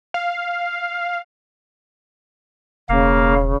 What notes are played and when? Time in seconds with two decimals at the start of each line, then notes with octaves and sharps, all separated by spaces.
0.14 F5
2.89 E1 C#3 A#3 F5